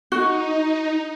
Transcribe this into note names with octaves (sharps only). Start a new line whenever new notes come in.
D#4 F#4